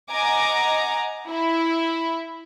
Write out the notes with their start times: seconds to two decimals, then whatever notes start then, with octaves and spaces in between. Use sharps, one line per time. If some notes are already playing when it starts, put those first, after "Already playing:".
0.11 D#5 F#5 G#5 A#5 D6
1.29 E4